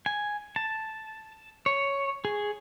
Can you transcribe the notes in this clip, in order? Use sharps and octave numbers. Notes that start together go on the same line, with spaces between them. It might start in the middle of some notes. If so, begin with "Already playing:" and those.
G#5
A5
C#5
G#4